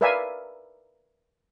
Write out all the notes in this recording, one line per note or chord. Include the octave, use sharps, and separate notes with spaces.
A#4 B4 D5 E5 F5 G#5